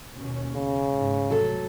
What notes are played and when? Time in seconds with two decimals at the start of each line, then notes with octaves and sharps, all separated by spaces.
0.16 D#2 B2 C#4
0.55 C#3
0.93 G#2
1.30 F1 F#3 A4